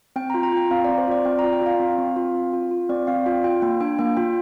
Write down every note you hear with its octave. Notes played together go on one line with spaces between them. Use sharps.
C4 G5
A#5
F4
A#5
F4 G5
C4 F5
C4 D5
C5
F4 D5
C4 G5
F4 A#5
G5
F4 F5
C4
C4
F4
C4
F4
F4
C4 D5
C4 F5
F4 G5
F4 G5
A#3 G5
D4 G5
A#3 G5
F4 G5